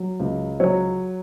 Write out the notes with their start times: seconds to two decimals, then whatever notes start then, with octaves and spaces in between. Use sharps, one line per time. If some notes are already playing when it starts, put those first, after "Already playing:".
Already playing: F#3
0.20 C#2
0.60 F#3 C#5